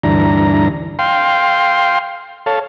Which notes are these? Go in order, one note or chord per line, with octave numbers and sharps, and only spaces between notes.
D2 G2 E3 D4 A#5
F5 G5 C6
A4 C#5 F5 A5